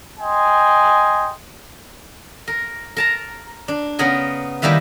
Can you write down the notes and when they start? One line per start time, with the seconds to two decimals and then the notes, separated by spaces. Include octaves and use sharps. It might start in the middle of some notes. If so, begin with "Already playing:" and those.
0.20 D#5 G5 G#5 C6
2.48 A#4
2.97 A#4 A5 A#5
3.68 D4
3.99 C#3 B3 A#4 G#5
4.62 D#3 G3 A#3 E4 B4